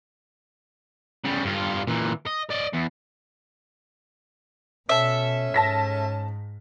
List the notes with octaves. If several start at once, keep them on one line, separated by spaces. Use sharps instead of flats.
C#3 G3
G2 F4
A#2 E3
D#5
D5 D#5
E2
B2 C#4 A4 E5
G#2 A5 A#6 B6